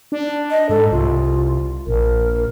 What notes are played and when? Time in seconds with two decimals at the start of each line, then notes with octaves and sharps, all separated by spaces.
0.12 D4
0.51 D#5
0.69 G#2 A4
0.92 C2 F4
1.87 A#1 A#4